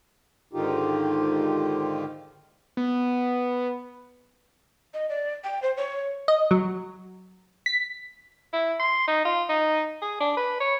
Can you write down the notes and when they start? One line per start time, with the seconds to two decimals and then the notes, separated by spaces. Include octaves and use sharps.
0.53 G#2 D3 D#3 D#4 F4 G4
2.77 B3
4.94 D#5
5.09 D5
5.44 G5
5.62 C5
5.77 C#5
6.28 D#5
6.51 F#3
7.66 B6
8.53 E4
8.80 C6
9.07 D#4
9.25 F4
9.49 D#4
10.02 G#4
10.20 D4
10.37 B4
10.60 C#5